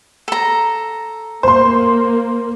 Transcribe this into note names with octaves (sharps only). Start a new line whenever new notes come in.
A4 A#5
A#3 C5 C6